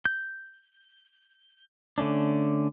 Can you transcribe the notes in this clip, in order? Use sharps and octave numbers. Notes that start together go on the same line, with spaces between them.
G6
D3 A3 C#4 D4